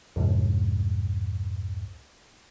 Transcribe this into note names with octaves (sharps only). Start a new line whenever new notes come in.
C2 F2 G#2